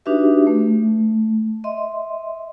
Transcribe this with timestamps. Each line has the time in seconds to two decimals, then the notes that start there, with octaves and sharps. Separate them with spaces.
0.06 D4 D#4 F#4 G4 B4 E5
0.47 A3
1.64 D#5 E5 C6